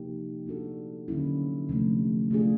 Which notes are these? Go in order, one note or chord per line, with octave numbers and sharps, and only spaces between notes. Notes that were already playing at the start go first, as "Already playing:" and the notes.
Already playing: C3 F3 A#3 D#4 G4
A#3 D4 F#4 A4
D3 F#3 A#3 C#4 E4
C3 F3 A3
A3 D4 F4 G#4